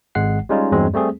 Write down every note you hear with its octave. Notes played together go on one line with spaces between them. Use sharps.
G#1 G#3 F#5 C7
G3 G#3 C#4 D#4 F4
E2 G2 F#3 G#3 C4
G3 A3 C4 G#4